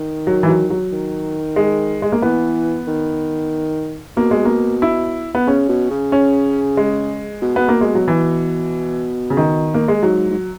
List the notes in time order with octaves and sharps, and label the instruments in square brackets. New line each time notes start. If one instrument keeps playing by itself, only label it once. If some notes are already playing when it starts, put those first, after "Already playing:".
Already playing: [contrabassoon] D#3
[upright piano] F#3
E3
F#3
F#3
[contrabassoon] D#3
[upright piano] G#3
G#3
A#3
[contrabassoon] E3 [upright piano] B3
[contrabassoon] D#3
[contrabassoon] B2 [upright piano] A#3
[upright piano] G#3
A#3
E4
B3
[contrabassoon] C#3 [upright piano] C#4
[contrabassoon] B2
C#3
[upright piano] C#4
G#3
[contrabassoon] B2
[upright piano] B3
A#3
G#3
F#3
E3
C#3
D#3
A#3
G#3
[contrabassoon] G#2 [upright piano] F#3
[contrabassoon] G#2